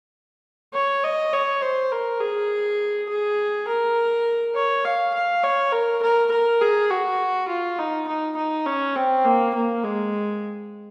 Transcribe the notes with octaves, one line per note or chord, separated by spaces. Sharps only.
C#5
D#5
C#5
C5
A#4
G#4
G#4
A#4
C#5
F5
F5
C#5
A#4
A#4
A#4
G#4
F#4
F4
D#4
D#4
D#4
C#4
C4
A#3
A#3
G#3